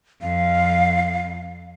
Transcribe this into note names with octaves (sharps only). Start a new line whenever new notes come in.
F2 F5